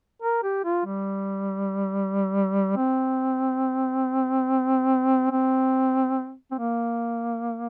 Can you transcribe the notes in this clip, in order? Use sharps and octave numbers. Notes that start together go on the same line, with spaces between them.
A#4
G4
F4
G3
C4
C4
C4
A#3